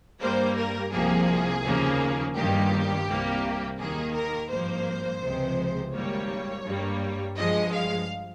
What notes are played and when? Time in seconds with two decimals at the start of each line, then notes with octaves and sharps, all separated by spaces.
0.20 G2 G3 A#3 C5
0.57 A#4
0.92 C2 C3 F3 A#3 G#4
1.64 D#2 C#3 F3 A#3
2.35 G1 G2 D#3 G3 A#3 G4
3.07 C2 C3 G3 A#3
3.78 D#2 D#3 A#3 G#4
4.14 A#4
4.50 G#1 G2 F3 A#3 C5
5.22 C#2 C3 F3 G#3
5.93 G#1 G#2 G3 A#3 C#5
6.65 G2 G3 A#3
7.36 G2 F3 G#3 D#5
7.72 F5